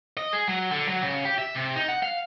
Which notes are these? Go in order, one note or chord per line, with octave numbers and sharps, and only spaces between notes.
D#5
G#4
F#3
D3
F#3
C#3
G4
E5
C3
D#4
F#5
F5